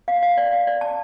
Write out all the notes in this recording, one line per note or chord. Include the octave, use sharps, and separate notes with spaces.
F5
F5
D5
F5
D5
A5